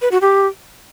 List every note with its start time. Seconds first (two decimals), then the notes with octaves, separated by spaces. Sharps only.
0.02 B4
0.12 F#4
0.22 G4